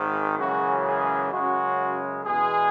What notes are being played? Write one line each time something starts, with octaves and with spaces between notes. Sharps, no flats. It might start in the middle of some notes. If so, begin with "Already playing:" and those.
Already playing: G#1 G#2 D#3
F#2 C#3 E3 G#3 F#4
G#4
F#2 C#3 G#3 F#4
E2 B2 G#3 G#4